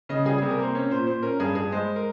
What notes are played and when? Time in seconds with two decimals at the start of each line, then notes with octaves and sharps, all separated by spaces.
0.09 C#3 D#5
0.25 G3 G#4
0.38 C3 G#4
0.50 A#4
0.59 A#3 C5
0.75 C#4 C#5
0.90 A#2 C5
1.07 A#2 C5
1.23 C#4 A#4
1.39 G2 G#4
1.55 G2 G#4
1.72 G#3 C5
1.96 A#4